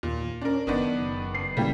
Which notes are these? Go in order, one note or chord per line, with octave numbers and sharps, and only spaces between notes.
D#2 A#2
C#4 D4 A#4
F#1 D#3 B3 D4
C7
C#3 E3 G3 A#3 G5